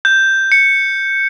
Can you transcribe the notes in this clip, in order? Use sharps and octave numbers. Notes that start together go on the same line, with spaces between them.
G6
C#7